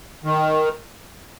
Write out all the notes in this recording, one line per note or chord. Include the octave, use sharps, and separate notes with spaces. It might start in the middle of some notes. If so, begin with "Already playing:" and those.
D#3